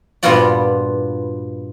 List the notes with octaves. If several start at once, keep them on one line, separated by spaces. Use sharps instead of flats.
G2 A#2 B3 F4 F#4 D5